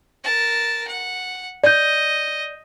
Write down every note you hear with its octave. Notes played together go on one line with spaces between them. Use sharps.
A#4 A5
F#5
D5 D#5 G6